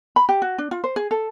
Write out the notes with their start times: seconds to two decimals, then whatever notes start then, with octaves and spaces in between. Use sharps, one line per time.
0.16 B5
0.29 G4
0.42 F#4
0.58 D4
0.71 F4
0.84 C5
0.96 G#4
1.11 A4